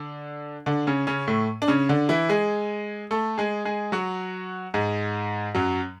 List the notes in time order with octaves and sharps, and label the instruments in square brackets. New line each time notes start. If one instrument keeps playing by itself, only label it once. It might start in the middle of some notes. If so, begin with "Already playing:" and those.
Already playing: [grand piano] D3 D4
D3 D4
C#3 C#4
C#3 C#4
A2 A3
D4
C#3 C#4
D3 D4
E3 E4
G#3 G#4
A3 A4
G#3 G#4
G#3 G#4
F#3 F#4
G#2 G#3
F#2 F#3